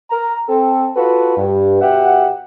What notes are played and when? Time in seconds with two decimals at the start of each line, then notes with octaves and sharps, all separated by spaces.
0.11 A#4 A#5
0.49 C4 A4
0.96 F4 F#4 A4 B4
1.37 G2
1.81 B2 G4 E5 F#5